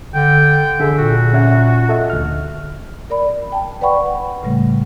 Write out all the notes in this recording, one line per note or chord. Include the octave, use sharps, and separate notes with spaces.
D3 G5
D3 G#4 A4 E5
A#2 F#4
C#4 E5 F#5
A4 D#5 E5
D2 F6
A#4 D5 B5
G5 A5
B4 D5 F#5 G5 B5 C#6
A2 C#3 G3 A3